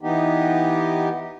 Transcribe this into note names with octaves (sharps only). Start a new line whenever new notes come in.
E3 B3 D#4 G4